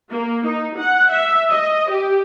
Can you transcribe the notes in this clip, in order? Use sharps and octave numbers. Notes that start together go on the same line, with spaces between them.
A#3
D#4
F#5
E5
D#5
G4